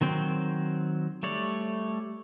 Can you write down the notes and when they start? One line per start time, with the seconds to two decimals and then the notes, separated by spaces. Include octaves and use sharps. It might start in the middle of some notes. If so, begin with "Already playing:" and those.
0.01 D#3 F#3 C4 G5
1.23 G3 A3 C#5 D5